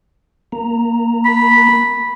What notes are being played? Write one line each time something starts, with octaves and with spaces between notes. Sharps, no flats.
A#3 A#5
B5